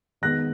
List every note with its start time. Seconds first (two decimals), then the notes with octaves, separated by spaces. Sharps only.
0.22 D#3 G#3 B3 F#6 A#6